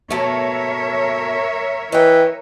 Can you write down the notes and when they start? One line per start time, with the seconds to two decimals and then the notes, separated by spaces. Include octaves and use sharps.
0.10 B2 A3 A#4 C#5 E5
1.92 E3 D#5 G5